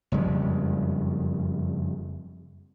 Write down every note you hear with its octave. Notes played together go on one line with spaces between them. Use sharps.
F#1 F2 G3 G#3